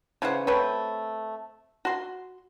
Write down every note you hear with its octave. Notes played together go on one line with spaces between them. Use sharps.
C#3 E3 C5 F#5
A3 C4 B4 C#5
F#4 C6